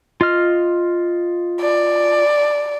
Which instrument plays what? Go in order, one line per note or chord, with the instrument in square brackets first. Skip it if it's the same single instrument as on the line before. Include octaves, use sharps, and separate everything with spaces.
[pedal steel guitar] F4 D#5 F6
[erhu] D5